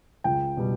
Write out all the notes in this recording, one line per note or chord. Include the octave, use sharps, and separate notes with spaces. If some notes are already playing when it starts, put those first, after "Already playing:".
C#2 G5
B2 G3